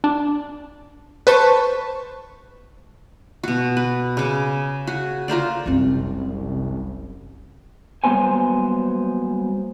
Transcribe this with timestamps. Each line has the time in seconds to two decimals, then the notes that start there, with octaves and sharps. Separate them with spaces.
0.04 D4
1.27 B4 C5 A5 C#6
3.43 B2 F#4
3.77 B4
4.17 C#3 D6
4.87 F#4
5.28 F4 A#4 C5 D5
5.66 F#1 C2 C4
8.04 F#3 G3 A#3 B3 C5 G#5